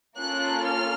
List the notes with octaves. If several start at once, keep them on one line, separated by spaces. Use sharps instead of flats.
A#3 C#4 F4 A4 F#6
F6